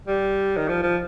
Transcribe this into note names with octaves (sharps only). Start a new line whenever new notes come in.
G3
D#3
F3
F3